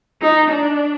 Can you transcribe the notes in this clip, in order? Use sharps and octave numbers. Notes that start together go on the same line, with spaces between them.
D#4
D4